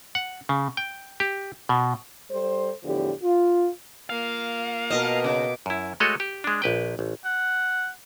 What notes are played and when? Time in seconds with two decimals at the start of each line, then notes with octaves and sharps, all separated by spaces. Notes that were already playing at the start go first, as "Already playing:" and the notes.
0.15 F#5
0.49 C#3
0.77 G5
1.20 G4
1.69 B2
2.29 G3 A4 C5
2.84 E2 A2 D3 F3 G4
3.22 F4
4.10 A#3 F4 F5
4.90 B2 A#4 D#5 A5
5.24 C#3 D6
5.66 F#2 E4
6.00 G#3 A3 F#4 A4 C#5 D#5
6.20 G4
6.44 G#3 D4
6.62 A#1 B4 G5
6.99 A1
7.25 F#5